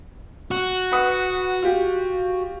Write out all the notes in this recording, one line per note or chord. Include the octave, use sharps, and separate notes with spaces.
F#4
B4 F#5 D#6
F4 G4